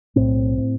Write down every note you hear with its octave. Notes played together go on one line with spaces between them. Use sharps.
B1 A2 C4
A2